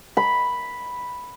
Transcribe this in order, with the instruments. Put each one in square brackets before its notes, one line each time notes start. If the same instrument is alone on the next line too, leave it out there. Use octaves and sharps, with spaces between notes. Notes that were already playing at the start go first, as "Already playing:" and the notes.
[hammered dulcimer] B5